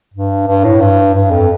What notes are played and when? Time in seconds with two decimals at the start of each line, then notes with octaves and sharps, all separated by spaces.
0.14 G2
0.47 G2
0.64 A2
0.81 G2
1.14 G2
1.31 F2